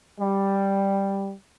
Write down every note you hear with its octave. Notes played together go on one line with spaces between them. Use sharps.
G3